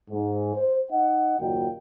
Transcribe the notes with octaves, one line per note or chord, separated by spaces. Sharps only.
G#2
C5
D#4 D#5 F#5
F#1 D#2 A#2 F#4 G5